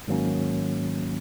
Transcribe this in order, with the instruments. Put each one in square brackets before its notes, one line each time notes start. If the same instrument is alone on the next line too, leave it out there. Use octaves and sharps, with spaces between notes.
[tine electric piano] G#2 D#3 F#3 A#3 C#4